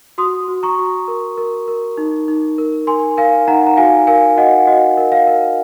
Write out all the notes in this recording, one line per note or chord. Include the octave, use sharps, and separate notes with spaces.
F#4 C6 D#6
F#4
A#5 C#6
F#4
A#4
A#4
A#4
D#4
D#4
A#4
A#4 G#5 C6
A#4 F5 G#5
D#4 F#5 A#5
A#5
F#4 F5 G#5
A#4 F5 G#5
F#4 D#5 F#5
F#4 D#5
A#4
F5
A#4